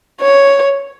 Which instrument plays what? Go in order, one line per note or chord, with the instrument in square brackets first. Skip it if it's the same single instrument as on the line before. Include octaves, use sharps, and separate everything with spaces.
[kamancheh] C#5